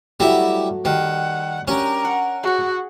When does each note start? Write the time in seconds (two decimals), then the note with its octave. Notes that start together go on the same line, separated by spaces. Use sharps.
0.20 F#3 G3 A3 E4
0.85 D#3 G3 F#5
1.68 C#4 D4 G4 A#4
2.05 F#5
2.44 F#4 G#4 F#5